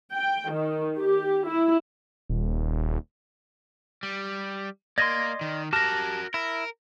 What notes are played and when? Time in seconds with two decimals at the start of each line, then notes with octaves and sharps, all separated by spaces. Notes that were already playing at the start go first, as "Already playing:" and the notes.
0.14 G5
0.51 D#3
0.97 G4
1.48 E4
2.30 D#1
4.03 G3
4.98 A#3 D5 D#5 C6 G#6 A#6
5.41 D#3
5.73 F#4 G4 A#4 A5 F6 A#6
6.34 E4 A#4